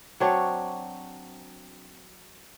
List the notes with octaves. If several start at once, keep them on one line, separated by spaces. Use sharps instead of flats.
F#3 C4 D4 C#5